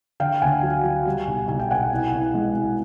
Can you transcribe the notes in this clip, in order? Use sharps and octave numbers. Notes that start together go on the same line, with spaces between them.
D3 F5 G5
D2 F#5 G#5
F#3
F#3
G3
B1
B1 G#5
G5
B2 F#5 G#5
C2
C2
G#3
C2